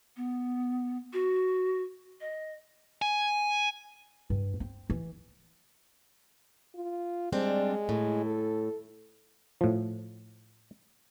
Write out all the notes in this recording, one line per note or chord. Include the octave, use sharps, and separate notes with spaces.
B3
F#4
D#5
G#5
G2
C4
E3
F4
G3 G#3 C4 D4
A2
A4
A2 F3